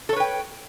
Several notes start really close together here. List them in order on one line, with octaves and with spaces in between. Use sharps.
A4 C#5 B4 G5